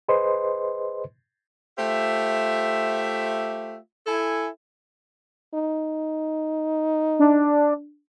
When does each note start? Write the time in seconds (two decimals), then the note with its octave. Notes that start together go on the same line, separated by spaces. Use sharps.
0.08 G#4 B4 C5 D#5 C6
1.79 A3 F4 G4 C5 E5
4.07 E4 A4 G#5
5.54 D#4
7.19 D4